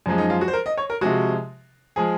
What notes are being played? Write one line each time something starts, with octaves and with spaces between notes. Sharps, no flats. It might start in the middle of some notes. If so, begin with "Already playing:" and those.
F#2 F3 G#3
D#4
F4
F#4
C5
A#4
D#5
C#5
A#4
C3 F3 G#3 F#4
F3 G#3 G#4